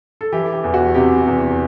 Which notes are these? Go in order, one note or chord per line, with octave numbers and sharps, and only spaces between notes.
A4
E3 G4
G4
E2
F#4
C3 G4
E2